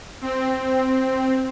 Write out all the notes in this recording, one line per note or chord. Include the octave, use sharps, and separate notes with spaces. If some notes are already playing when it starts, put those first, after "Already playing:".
C4